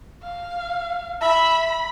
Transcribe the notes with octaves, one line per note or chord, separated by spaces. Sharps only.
F5
E5 B5